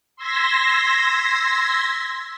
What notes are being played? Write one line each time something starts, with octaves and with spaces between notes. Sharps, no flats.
C6 E6 G#6 A#6 B6